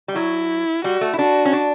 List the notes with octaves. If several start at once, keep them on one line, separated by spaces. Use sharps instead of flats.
G3
F#3 E4
G3 F#4
A3
E4
D4 F#4
C#4
D4